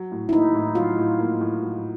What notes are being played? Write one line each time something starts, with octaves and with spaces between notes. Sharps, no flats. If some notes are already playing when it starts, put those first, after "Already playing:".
Already playing: F#3
A2
E4
A#3 D#4
A2
F#3 F4
A2
A#3
A2
F#3